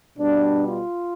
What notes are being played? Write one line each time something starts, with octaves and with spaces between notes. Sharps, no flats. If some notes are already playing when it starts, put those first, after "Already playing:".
B2 G3 D4
F4